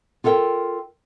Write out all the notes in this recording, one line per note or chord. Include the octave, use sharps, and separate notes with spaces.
F4 A4 A#4 F5 G5